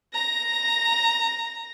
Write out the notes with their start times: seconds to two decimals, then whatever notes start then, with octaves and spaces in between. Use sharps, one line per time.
0.14 A#5 A#6